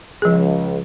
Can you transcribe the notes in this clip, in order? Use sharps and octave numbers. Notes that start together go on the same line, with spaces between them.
C#2 F3 G#4